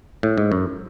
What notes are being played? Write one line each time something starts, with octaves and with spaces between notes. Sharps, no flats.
A2
G#2
F#2